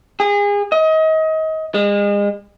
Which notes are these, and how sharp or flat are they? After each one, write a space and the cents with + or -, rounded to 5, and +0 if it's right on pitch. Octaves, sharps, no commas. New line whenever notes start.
G#4 -30
D#5 +30
G#3 -35